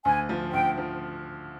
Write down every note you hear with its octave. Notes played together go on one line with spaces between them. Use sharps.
D2 G#5
F3
D2 G5
F3